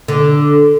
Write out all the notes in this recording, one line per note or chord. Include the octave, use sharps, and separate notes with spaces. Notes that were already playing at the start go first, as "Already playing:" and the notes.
D3